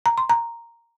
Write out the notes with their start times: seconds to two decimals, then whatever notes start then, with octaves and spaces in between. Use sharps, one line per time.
0.06 A#5
0.18 C6
0.30 A#5